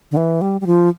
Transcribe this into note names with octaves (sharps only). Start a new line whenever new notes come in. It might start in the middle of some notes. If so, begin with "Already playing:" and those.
D3
E3
G3
G3
F3